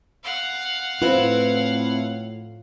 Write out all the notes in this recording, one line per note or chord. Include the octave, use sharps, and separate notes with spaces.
F5 F#5
A2 C4 E4 F4 B4